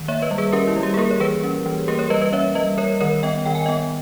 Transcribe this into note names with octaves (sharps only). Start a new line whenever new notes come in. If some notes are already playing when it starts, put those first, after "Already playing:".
Already playing: D#3
A#3 C#5 E5
B4 D#5
G3
G#4 B4
C#4 G4 A#4
E4
G3
G4
G#4
A#3 G4 A#4
C#5
E3 G#4 B4
C#4
E3
A#3 G4 A#4
A#4 C#5
G3 B4 D#5
B4 D#5
C#4 C#5 E5
G3 B4 D#5
G3 A#4 C#5
D#3 A#4 C#5
B3 D#5 G5
D#3 G5
G#5
B3 D#5 G5